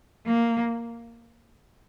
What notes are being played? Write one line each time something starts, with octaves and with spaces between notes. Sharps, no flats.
A#3